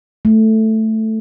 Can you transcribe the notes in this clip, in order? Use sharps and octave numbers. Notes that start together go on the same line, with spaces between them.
A3